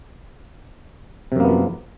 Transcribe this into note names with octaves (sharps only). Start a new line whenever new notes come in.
F#2 C3 F3 A#3 B3